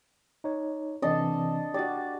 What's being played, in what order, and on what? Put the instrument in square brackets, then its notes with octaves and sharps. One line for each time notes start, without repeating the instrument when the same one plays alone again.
[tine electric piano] D#4 C#5
[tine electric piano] C3 E3 C4 [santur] D4 A4 D#5
[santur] F#4 D5 [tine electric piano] G4 A6